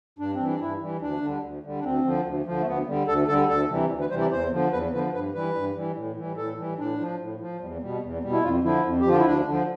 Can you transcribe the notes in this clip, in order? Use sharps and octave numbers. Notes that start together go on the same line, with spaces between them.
G2 D4
C4
E3 G3
D4
G2 E4
E3 G3
D2 D4
D3 G3
D2
D3 G3
D4
D2 C4
D3 F3
D2
D3 F3
A3
D2 B3
D3 G3
D2 A4
D3 G3 A4
D2 A4
C3 E3 G3
D2
B4
C3 E3 G3 C5
D5
E2 C5
D3 F3
E2 B4
D3 F3 B4
G2 B4
E3 G3 B4
G2
E3 G3
A2
E3 G3
A2 A4
E3 G3
A2 D4
F3
A2
F3
E2 G3
B2 G3
E2
B2 G3
E4
F2 F4
D3 F3 E4
F2
G4
D3 F3 F4
E4
D2 D4
D3 F3